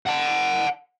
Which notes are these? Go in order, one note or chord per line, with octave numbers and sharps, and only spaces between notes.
F#5 A5